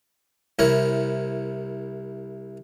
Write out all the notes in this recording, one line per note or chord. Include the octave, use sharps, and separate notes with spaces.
C2 C3 E4 A#4 C#5